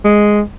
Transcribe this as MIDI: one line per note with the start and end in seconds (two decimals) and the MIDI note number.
0.04 0.41 56